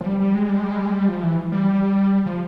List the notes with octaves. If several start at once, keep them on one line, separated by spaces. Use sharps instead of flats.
F3
G3
G3
G#3
G3
G#3
G3
G#3
G3
G#3
G3
F3
E3
G3
F3